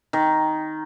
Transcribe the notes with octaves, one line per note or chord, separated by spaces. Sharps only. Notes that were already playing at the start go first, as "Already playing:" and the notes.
D#3